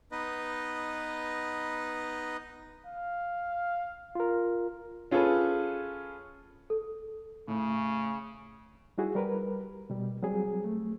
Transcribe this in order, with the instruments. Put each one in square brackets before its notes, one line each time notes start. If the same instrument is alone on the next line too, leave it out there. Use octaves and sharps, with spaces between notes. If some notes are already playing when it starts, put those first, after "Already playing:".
[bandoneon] B3 D#4 B4 D#5
[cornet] F5
[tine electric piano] F4 A#4
[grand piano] C#4 F4 G#4 A4 B4
[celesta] A4
[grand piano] A2 [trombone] C#3
[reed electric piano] G3 D#4 E4 F#4 G#4
G3 A#4 B4
B2 G3
F#3 G3 C4 G#4
A3